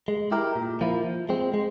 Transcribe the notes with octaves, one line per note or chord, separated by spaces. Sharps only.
G#3
E4 G4 A#4
A#2
F3 A#3 E4
F3
G#3 C4
G#3